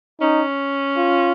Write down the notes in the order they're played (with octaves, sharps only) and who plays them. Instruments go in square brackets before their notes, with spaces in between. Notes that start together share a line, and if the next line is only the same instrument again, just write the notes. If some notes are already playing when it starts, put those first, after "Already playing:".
[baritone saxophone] C#4 [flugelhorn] D#4
[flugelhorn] F4